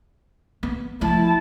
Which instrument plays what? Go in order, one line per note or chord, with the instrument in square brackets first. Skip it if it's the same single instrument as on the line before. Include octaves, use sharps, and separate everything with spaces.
[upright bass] B3
[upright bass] F3 A3 [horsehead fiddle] E4 A5